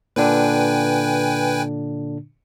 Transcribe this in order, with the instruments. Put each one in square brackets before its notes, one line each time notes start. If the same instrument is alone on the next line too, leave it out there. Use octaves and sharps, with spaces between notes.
[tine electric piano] A#2 D3 D4 [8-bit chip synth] B4 G5 G#5